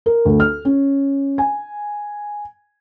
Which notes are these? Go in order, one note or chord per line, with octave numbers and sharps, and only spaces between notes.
A#4
D2
F6
C#4
G#5